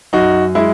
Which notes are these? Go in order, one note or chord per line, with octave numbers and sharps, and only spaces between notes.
F#2 D#4 F#4
G#3 E4